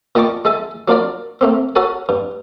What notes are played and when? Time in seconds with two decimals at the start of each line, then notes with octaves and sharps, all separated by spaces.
0.15 A#2 D#5 G5 A5 C#6 D6
0.45 G#3 A4 E5 G#5
0.88 F#3 A#3 D4 F4 A#4 D5
1.41 A3 A#3 C4
1.75 F#4 A4 A#4 C#5 F#5 G#5
2.09 G2